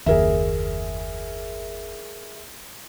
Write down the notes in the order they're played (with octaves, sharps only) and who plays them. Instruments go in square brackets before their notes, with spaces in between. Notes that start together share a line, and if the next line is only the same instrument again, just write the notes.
[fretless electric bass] F#1 D#2 [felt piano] G#4 A#4 E5